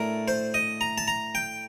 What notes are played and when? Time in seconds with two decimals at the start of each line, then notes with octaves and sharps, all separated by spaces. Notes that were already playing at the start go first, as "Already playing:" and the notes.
Already playing: A2 A3 D4 A#4
0.28 C5
0.54 D#5
0.81 A#5
0.98 A5
1.08 A#5
1.35 G5